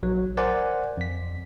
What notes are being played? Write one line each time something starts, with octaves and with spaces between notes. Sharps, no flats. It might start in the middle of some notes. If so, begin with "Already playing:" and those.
A#1 F#3
A#4 C5 D5 F#5 G#5
F2 B6